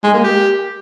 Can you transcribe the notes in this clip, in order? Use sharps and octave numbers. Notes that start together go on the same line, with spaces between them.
G#3
A#3
G4